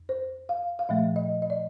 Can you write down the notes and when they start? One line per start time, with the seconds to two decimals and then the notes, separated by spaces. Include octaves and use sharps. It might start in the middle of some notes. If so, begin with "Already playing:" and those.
Already playing: F2
0.09 C5
0.49 F5
0.79 F5
0.89 A#2 F3 A3 E5
1.16 D#5
1.42 D#5
1.50 D5